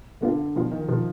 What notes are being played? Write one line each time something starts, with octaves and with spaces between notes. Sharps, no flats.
B2 D3 B3 F4
B2 F3 B3 F4
D#3
B2 F3 B3 F4